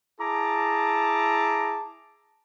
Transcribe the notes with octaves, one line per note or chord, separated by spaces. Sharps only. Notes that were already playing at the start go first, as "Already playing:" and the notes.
E4 G#4 A5 A#5 D6